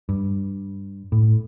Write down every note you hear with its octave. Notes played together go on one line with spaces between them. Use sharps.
G2
A2